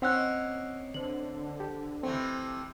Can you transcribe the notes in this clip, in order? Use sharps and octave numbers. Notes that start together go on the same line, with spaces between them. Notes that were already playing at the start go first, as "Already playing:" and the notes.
A#3 C4 C#4 D#4 F#5 E6 F#6
D3 C5 F#7
G4 A4
C3 E3 A3 C4